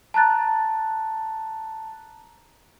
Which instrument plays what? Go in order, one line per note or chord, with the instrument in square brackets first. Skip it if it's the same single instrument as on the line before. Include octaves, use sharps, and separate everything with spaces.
[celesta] A5 A#5 F#6 A6